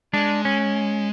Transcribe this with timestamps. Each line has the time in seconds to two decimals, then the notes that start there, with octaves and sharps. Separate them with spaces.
0.14 G#3 D4
0.45 C#4